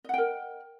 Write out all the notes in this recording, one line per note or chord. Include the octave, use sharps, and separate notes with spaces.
A#4 D#5 F#5 G5